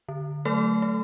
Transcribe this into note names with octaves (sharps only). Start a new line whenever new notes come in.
D3
F#3 A3 A4
A3